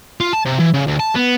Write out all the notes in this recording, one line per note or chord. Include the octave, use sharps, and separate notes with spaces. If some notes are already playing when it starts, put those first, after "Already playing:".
F4
A5
C3
E3
C#3
D2
A5
B3